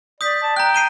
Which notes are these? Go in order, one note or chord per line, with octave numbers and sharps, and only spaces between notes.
D5 D#6 G6 B6
A5
G5 A#5 F#6
C7 D#7 G7